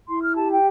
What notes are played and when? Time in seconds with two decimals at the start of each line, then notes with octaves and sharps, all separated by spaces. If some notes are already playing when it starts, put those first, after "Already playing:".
0.08 E4 C6
0.22 F6
0.36 G4 A5
0.51 G5